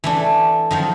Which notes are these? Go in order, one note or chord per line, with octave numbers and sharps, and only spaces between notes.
E3 A3 D4
D#3 F3 F#3